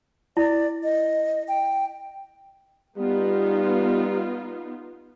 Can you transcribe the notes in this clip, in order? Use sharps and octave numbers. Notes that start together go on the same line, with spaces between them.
E4 D5
D#5
G5
G3 B3 D#4 F4